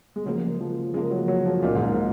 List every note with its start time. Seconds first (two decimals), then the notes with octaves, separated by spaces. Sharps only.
0.16 G#3
0.25 C#3 F3 F#3 A#3
0.42 G#3
0.60 F3
0.94 C#3 F3 G#3 A#3
1.11 F#3
1.28 F#3
1.45 F3
1.62 C#2 A#2 C#3 F#3 A#3 D#4
1.75 G#2
1.89 A#2